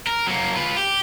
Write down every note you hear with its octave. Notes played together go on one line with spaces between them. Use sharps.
A#4
F#3 A#3
F4 B4
G4